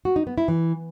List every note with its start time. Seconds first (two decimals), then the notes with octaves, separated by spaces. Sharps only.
0.05 F#4
0.16 D#4
0.27 B3
0.38 E4
0.48 E3